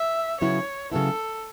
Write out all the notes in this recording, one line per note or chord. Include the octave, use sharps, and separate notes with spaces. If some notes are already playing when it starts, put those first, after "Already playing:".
Already playing: E5
C#3 F#3 B3 E4 C#5
C#3 F#3 B3 E4 A4